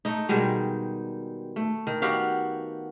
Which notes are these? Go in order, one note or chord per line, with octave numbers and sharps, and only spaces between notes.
A3 D#4
B2 D#3 G3 G#3
A3
D#3
B3 F#4 G4 F5